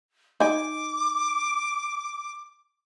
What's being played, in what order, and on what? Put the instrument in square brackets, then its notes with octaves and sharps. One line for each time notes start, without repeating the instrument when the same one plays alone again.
[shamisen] D#4 G#5 [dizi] D6